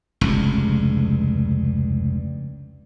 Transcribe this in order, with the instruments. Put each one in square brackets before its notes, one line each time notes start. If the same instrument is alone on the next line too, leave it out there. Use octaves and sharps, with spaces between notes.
[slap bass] F1 C#2 G2